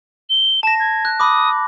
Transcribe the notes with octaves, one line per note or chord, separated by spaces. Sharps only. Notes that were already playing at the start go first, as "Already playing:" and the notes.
G7
A5 A#6 E7
G#6
F#6
B5 D6 D#6